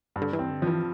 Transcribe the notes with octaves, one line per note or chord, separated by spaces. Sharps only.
G2
D3
E3
C4
D3
E3 F3